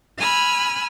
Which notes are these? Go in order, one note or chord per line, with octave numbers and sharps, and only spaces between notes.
G#5 B5 E6 F6